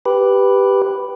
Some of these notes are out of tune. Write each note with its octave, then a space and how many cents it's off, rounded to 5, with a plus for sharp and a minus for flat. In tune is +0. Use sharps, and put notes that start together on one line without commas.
G4 +0 B4 +0